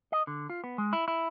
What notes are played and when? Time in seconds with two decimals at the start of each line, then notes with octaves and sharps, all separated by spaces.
0.12 D#5
0.27 D3
0.50 F4
0.64 B3
0.78 G#3
0.93 E4
1.08 E4